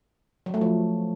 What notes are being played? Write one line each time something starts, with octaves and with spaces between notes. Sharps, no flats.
F#3
A3
F3